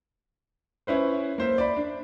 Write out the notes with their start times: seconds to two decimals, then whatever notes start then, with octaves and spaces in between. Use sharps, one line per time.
0.87 C#4 E4 B4 C5
1.38 A#3 C5 E5
1.58 D5 B5
1.77 D4